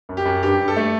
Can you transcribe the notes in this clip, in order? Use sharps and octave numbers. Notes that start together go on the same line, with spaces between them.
F#2
G4
F#2
G2 G4
G2
A4
A3